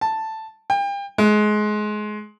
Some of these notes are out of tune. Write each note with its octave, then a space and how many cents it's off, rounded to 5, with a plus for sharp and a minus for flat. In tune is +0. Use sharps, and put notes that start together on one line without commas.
A5 +5
G5 +35
G#3 +25